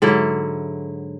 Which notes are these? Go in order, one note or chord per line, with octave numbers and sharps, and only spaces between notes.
G#2 D3 F#3 E4